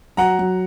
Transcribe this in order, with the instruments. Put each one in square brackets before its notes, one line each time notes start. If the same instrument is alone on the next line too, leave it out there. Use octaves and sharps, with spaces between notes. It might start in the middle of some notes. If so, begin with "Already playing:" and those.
[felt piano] F#3 [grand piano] F#5 A#5
[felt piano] F#3